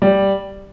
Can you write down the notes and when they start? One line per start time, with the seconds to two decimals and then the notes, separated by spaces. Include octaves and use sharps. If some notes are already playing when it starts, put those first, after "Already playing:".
0.02 G3